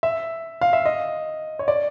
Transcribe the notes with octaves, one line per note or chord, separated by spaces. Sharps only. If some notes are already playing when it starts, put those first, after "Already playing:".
E5
F5
E5
D#5
C#5
D5